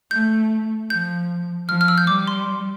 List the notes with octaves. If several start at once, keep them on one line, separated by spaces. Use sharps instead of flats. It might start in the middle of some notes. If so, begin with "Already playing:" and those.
A3 G6
F3 G6
F3 F6
F6
E6
G6
G3 D6
C6